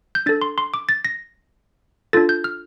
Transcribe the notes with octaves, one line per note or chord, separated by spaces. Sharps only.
G6
D4 A4 A6
C6
C6
D6
A6
A#6
D4 F4 A4 A6
G6
F6